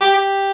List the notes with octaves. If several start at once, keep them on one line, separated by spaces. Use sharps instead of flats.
G4
G4